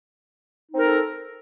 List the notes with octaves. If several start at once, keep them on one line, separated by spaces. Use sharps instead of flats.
C4 D#4 A4 A#4